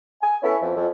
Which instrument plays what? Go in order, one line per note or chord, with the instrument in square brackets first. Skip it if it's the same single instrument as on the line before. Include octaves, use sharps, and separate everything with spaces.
[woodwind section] G#5
B3 C#4 E4 A4
F2
F2